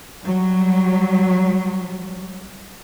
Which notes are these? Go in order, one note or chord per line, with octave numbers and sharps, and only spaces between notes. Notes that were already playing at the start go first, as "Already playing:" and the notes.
F#3 G3